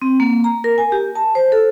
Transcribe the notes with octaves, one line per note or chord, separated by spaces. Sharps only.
C4
A#3
A#5
A#4
G#5
G4
A5
C5
A4